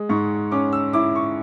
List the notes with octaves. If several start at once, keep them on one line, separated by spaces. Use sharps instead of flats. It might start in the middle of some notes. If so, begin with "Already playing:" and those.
Already playing: G#3
G#2 C#6
C#4 D6
E6
E4 D6
C#6